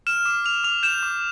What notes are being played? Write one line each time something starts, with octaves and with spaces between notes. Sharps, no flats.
F6 E7
D6
F6 F7
D6 F7
G6 E7
D6